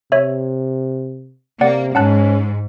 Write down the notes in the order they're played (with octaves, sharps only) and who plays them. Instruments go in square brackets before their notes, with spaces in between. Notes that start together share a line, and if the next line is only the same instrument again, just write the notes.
[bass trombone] C3 [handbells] C#5 E5
[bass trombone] C3 [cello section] A#3 [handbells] D5 F#5
[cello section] G#2 [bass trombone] C#4 [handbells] F#5 A5 F#6